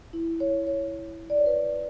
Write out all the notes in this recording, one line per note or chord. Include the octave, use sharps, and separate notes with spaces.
E4
C#5
C#5
D5
C#5
B4